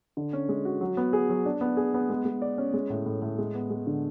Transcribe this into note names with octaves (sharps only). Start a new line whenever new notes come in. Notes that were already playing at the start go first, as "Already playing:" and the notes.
D3
C#4
G#3
F#4
F#3
B3
G#4
F#3
D4
B3
G#4
B3
G#3
G#3
D5
C#4
G#3
A2
A2
A2
G#3
B3
G#3
D3